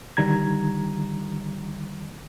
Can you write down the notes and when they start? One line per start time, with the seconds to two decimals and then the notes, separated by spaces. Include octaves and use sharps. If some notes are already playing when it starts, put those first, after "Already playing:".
0.17 D3 D#3 G3 A#5 G#6